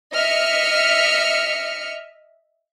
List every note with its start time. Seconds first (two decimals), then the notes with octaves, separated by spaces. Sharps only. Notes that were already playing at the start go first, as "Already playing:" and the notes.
0.13 D#5 E5 F6 C#7